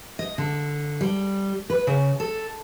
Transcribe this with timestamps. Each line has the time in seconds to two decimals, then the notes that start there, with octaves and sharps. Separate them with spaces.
0.19 D#5
0.38 D3
1.01 G3
1.70 B4
1.87 C#3
2.20 A4